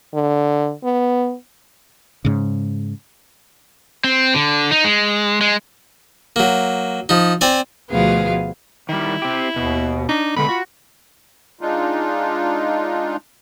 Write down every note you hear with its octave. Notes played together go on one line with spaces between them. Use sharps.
D3
B3
G#2 C#3
C4
D3
D#4
G#3
G#3
F#3 A#3
F3 D#4
C4 D5 G#5
D2 B2 F3 B3 G#4 F5
D#3 G3 E4
C4 G4
D#2 B2
D4 D#4
B2 D3 G#3 B4 B5
F4 F#4
G#3 D4 D#4 F4